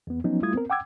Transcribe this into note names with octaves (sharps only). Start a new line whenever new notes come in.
E2 B3
F3 F#3 B3 C#4 D#4
G3 A3 E4 F4 D#6 G#6
B3 C4 A#4
F#5 G5 D6 E6 G#6